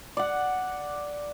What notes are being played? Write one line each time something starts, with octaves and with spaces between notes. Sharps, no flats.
D5 F#5